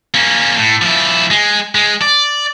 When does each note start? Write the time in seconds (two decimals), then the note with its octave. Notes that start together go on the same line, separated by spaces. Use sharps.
0.14 A#3 C#4
0.57 A2
0.82 F3 E4
1.31 G#3
1.75 G#3
2.01 D5